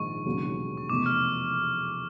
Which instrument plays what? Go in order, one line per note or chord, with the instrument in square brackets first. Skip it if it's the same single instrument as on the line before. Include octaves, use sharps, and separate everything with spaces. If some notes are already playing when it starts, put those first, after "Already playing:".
Already playing: [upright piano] A#1 G#2 D#3 G#3 [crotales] C#6
[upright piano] E1 D#2 C#3 F#3
[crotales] C#6
[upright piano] F1 E2 B2 [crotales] D6
[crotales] F6